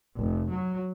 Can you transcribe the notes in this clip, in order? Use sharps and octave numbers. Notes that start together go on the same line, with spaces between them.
F1
F#3